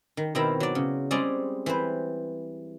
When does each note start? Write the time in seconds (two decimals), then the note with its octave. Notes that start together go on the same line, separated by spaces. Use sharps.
0.17 D#3
0.35 B2 D#3 C4 E4 A#4 G5
0.60 F#3 D5
0.75 C#3
1.11 G3 G#3 C4 C#4 G#4 D5
1.66 E3 C4 B4 C5